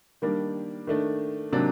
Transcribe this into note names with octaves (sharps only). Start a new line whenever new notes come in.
D#3 G3 A#3 D4
D#3 A3 D4
C3 D#3 F#3 A#3 D4